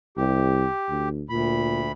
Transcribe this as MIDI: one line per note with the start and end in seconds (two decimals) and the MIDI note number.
0.17 0.66 36
0.17 1.09 67
0.89 1.24 38
1.29 1.92 38
1.29 1.88 46
1.29 1.92 83